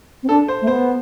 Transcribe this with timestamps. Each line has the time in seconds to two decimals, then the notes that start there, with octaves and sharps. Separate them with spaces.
0.23 C4
0.29 D4 A4
0.48 C5
0.62 A3
0.67 B3 C5